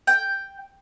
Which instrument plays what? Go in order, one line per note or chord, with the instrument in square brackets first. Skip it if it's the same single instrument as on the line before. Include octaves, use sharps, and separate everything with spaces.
[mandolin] G5